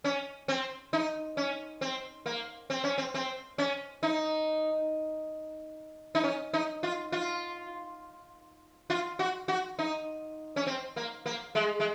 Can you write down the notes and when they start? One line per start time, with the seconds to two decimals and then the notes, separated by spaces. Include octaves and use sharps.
0.04 C#4
0.48 C4
0.93 D#4
1.37 C#4
1.81 C4
2.26 A#3
2.70 C4
2.84 C#4
2.98 C4
3.14 C4
3.58 C#4
4.03 D#4
6.15 D#4
6.24 C#4
6.53 D#4
6.83 F4
7.12 F4
8.90 F4
9.19 F#4
9.48 F#4
9.79 D#4
10.56 C#4
10.67 C4
10.96 A#3
11.26 A#3
11.55 G#3
11.80 G#3